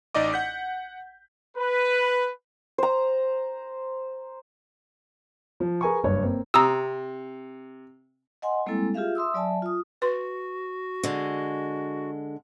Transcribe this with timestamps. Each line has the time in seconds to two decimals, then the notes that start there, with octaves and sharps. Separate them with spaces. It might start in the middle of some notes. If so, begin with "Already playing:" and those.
0.15 A1 D#4 D5 D#5 D6
0.33 F#5 G6 B6
1.57 B4
2.78 C5 A#5
5.60 F3
5.81 G#4 A#4 B4 G#5 A#5 C#6
6.03 F#1 G2 C#5
6.22 A#3 C4
6.54 C3 A#5 D#6 E6
8.42 D#5 F#5 G#5 C6
8.66 G3 G#3 A#3 C4 E4 A4
8.94 F4 G4 G#4 E5 F5
9.15 E5 C6 D#6 E6
9.34 F#3 D5 E5 G#5 A5
9.62 F4 D#6
10.02 F#4 B4 C6
11.04 D3 G#3